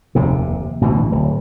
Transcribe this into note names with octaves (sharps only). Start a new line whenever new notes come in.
F1 D#2 C3
A1 D2 B2 E3
D1